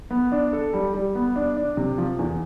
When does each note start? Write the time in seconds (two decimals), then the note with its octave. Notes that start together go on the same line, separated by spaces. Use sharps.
0.10 B3
0.32 D4
0.53 A4
0.73 G3
0.94 G3
1.15 B3
1.36 D4
1.57 D4
1.77 C3
1.98 F3
2.19 E2